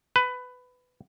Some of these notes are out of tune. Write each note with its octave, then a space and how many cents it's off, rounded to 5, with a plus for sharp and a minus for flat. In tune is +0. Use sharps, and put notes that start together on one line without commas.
B4 +15